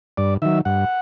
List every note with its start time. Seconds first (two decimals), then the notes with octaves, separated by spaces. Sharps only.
0.17 G2 D5
0.42 D#3 F#3 E5
0.65 G2 F#5